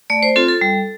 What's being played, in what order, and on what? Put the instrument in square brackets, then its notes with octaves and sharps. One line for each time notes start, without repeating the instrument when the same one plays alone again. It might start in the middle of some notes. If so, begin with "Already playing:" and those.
[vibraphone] A3 D5
C5
C4 F4 A4
A4
G3